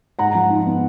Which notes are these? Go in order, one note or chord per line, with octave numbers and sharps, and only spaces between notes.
G#2 F#5 A#5
F3
D#4
B3